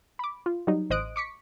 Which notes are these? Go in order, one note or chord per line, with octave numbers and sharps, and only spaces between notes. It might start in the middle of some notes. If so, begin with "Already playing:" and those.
B5 D6
F4
F#3 G3 D#4
A1 C5 D#5 D#6 F#6 D7
C#6 D6 B6 C#7